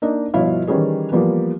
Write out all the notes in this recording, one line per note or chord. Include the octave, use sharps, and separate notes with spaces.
A#3 D4 D#4 D#5
G1 B2 F3 E4 C#5 F5
D#3 E3 G3 C#4 G#4 C#5
E3 F3 G3 A#3 B3